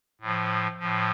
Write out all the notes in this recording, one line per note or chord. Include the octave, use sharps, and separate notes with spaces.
A2 F3
A2 F3